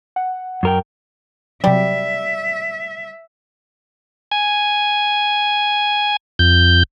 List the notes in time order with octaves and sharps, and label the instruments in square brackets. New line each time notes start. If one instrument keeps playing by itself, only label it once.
[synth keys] F#5
[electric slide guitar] F#2 A#4 G5
[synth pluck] C3 F#3 [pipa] G3 [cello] E5
[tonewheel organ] G#5
F2 G6